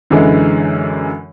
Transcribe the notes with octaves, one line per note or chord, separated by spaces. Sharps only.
F#2 D3 E3 G#3